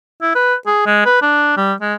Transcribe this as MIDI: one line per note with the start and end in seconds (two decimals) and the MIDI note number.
0.22 0.32 64
0.35 0.55 71
0.67 0.82 68
0.86 1.05 56
1.06 1.18 71
1.22 1.55 62
1.57 1.73 55
1.81 1.95 56